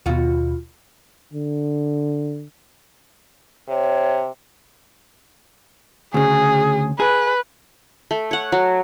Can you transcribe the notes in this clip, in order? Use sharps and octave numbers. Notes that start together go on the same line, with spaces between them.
D#2 B2 F4 F#4
D3
C3 C#5
D2 C#3 G#4
G#4 B4
A3
C#5 F#5
F#3